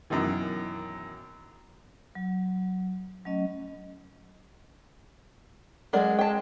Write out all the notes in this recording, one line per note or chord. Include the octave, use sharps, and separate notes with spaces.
F#2 B2 D#3 E3
F#3
F#3 A3 C#4 D#5
F#3 G#3 A#4 D5
G5 A5